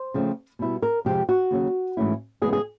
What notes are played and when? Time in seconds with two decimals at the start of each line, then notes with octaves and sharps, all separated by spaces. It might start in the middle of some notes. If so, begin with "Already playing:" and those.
Already playing: C5
0.14 C#3 F3 A3 C4
0.59 B2 G3 B3 E4
0.82 A#4
1.05 F2 C3 F3 G#3 C4 G4
1.29 F#4
1.51 D#2 C#3 F#3
1.97 G#2 E3 A3 C#4 E4
2.42 C#3 E3 G#3 B3 G#4
2.53 G#4